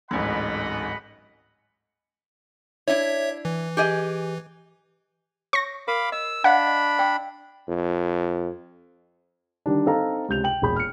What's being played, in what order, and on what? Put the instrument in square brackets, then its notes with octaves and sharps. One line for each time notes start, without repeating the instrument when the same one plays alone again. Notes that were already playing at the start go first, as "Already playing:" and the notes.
[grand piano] D1 A1 G#2 [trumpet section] D#5 F#5 B5
[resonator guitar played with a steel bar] D4 E4 [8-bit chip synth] C#5 E5
[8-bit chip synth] E3
[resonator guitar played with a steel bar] G4 G#4 D#5
[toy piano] C#5 [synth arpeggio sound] C#6 A#6
[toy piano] A#4 [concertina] F5 B5 D6
[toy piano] D#5 [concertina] E6
[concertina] D4 B5 [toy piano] D#5 F5 [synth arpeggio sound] F#5
[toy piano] D#5
D5 G5 E6
[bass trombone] F2
[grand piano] D3 D#3 G3 D4
C4 D#4 A4 F5 A#5
C#2 C3 G6 F7
G5 F#7
E1 A#2 G#4 B5 G6
F6 C#7